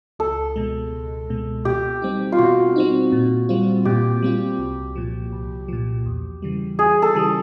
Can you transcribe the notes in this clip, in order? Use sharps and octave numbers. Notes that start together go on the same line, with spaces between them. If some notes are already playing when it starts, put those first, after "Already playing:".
C#2 A4
B2 G#3
C#2
B2 G#3
B2 G4
G3 C4 D#4
F4
B2 F#4
G3 C4 D#4
A#2
G3 C4 F4
A#2 G4
G3 C4 F4
C2
A#2 F3
C2
A#2 F3
E2
C#3 E3 G3
E2 G#4
A4
C#3 E3 G3